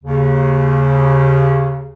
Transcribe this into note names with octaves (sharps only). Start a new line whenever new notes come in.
D#2 C#3